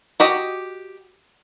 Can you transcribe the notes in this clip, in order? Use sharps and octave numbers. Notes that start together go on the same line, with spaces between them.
F#4 G4 D#5